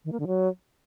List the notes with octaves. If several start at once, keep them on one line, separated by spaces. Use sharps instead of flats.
D#3
A#3
D3
F#3